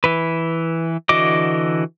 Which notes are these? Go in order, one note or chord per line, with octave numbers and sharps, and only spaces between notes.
E3 B4
D3 E3 F#4 D#5 D6